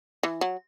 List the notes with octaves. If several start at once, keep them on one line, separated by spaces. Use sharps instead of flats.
E3
F#3